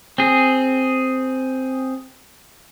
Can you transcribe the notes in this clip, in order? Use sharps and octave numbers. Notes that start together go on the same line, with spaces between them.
C4 G#4